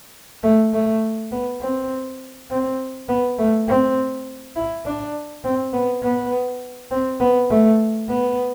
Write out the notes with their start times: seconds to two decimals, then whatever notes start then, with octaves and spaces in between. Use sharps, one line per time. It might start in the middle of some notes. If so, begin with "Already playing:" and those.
0.43 A3
0.73 A3
1.31 B3
1.61 C4
2.50 C4
3.09 B3
3.38 A3
3.68 C4
4.56 E4
4.86 D4
5.44 C4
5.73 B3
6.02 B3
6.91 C4
7.20 B3
7.50 A3
8.09 B3